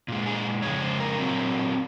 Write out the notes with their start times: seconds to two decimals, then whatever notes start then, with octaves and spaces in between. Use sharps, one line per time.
0.08 A#2 G#3
0.26 G#4
0.62 F2 C#3 G#3 C#5
0.82 C5
1.00 A#4
1.18 A#2 F#3 A#3 C4